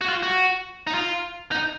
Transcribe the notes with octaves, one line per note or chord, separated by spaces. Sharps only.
F#4
F4
F#4
D#4
F4
D#4